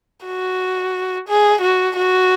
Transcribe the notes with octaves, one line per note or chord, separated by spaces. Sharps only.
F#4
G#4
F#4
F#4